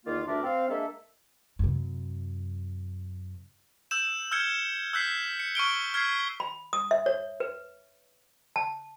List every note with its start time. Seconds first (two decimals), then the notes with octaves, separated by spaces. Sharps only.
0.06 E2 D#3 A#3 F4
0.27 D2 G2 D4 A#4 D5 E5
0.43 C4 F5
0.69 G#3 A#3 D4 A4 E5
1.59 F#2 C3
3.91 E6 G6 E7
4.31 E6 F6 G6 G#6 C#7 G7
4.93 E6 F#6 G6 B6 C7
5.40 C#7
5.55 C#6 F6 D7 G7
5.94 F6 G#6 B6 C7
6.40 B5
6.73 D#6
6.91 E5
7.06 C#5
7.40 B4
8.56 A5